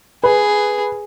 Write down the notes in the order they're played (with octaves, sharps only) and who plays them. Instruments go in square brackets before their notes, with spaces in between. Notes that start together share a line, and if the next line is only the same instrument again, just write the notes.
[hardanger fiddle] G#4 [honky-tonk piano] B4